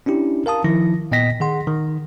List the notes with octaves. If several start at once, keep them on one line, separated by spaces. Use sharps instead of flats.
C#4 D4 E4 G4
A#4 F5 A5 D#6
D#3 F3 E4 A#6
A#2 B3 D#5 G5 A#6 B6
D#3 G#4 F#5 C6
D#3